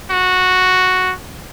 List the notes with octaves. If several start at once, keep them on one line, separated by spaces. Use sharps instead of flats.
F#4